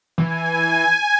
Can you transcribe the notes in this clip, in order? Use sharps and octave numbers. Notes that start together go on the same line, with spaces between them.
E3 G#5